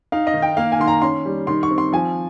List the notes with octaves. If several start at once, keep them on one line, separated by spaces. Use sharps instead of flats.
D#4 F5
D#5
D#3
G5
A#3 F5
G#5
D#3 C6
A#5
C#4 C6
G3
D#3 C6
C#6
C4
C6
F3 G#5